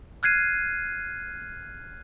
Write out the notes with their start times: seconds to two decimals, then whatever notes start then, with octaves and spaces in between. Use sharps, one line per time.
0.23 F6 F#6 G#6 C7 D#7